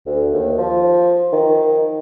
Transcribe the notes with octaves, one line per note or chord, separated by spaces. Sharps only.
D2
D#2
F3
D#3